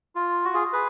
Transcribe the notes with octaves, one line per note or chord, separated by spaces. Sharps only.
F4
F#4
F4 G#4
G#4 B4